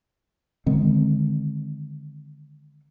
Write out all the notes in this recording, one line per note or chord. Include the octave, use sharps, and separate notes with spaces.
D3 D#3 G#3 C4